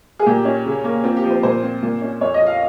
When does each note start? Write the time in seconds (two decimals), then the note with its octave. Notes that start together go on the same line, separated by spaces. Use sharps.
0.19 G#4
0.26 A#2 G4
0.45 C#4
0.66 C#3
0.84 A#3
1.04 C4 F4
1.17 G4
1.23 F3
1.30 C5
1.43 A#2 C5
1.62 C4
1.83 A#2
2.01 C#4
2.21 F2 C#5
2.34 D#5
2.41 F3
2.47 F5